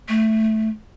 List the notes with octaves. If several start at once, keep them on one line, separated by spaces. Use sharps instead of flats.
A3